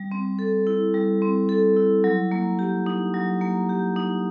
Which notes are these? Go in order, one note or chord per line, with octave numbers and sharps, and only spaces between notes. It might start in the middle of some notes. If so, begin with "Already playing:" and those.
Already playing: G3
C4
A4
E4
G3
C4
A4
E4
F#3
A#3
G4
D#4
F#3
A#3
G4
D#4